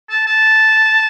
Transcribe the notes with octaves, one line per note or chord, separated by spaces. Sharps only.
A5
A5